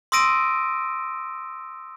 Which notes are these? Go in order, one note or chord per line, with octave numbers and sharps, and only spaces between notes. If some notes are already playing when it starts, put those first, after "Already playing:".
C6 D#6 E6 A#6 D7 D#7